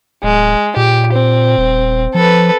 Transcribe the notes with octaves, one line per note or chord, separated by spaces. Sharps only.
D1 G#3
A#2 G4
C4
D#1
F3 A4 B4